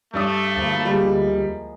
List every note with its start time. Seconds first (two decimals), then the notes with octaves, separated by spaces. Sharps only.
0.14 G2 A3 D4 D#6
0.56 D2 F3 A#3 E4
0.85 G3 G#3 G#4 D#5